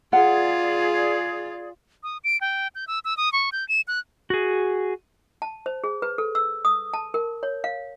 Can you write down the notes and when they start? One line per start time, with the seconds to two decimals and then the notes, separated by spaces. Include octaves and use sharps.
0.13 F4 G#4 D5 F#5
2.03 D#6
2.24 D7
2.41 G5
2.75 G6
2.87 E6
3.05 E6
3.17 D#6
3.33 C#6
3.52 G6
3.69 E7
3.88 F#6
4.30 F#4 G#4
5.42 A5
5.66 C5
5.84 G#4
6.02 B4
6.18 A4
6.35 E6
6.65 D#6
6.94 A5
7.14 A#4
7.43 C#5
7.64 F5